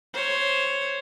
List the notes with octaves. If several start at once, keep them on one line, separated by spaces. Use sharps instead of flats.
C5 C#5